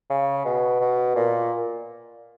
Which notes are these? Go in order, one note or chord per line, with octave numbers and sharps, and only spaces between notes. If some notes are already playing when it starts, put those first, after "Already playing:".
C#3
B2
B2
A#2